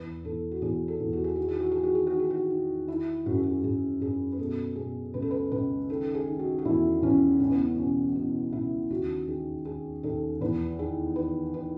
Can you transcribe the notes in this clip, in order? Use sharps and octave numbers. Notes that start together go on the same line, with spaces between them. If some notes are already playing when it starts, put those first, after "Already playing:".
Already playing: E2 B4
E2 A4
F#4
E2 G#4
A4
E2
F#4
G#4
D#3 F#4
G#4
F#4
D#3 G#4
F#4
G#4
F#4
D#3
G#4
F#4
D#3
D#3 E4
F#2 F#4
G#4
F#4
F#2 G#4
F#2 G#4
B4
B2 A4
B2 G#4
C#2 B4
A4
B4
C#2 B4
D#3 A4
G#4
D#3
F#4
F#4
E2 E4
E2 C#4
C#2 C#4
B3
C#4
B2 C#4
B2 C#4
C#2 E4
D#2 F#4
D#3 G#4
D#3 G#4
D#2 A4
E2 B4
D#3 G#4
D#3 B4
D#3 B4